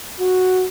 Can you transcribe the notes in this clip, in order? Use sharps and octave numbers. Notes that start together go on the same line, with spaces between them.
F#4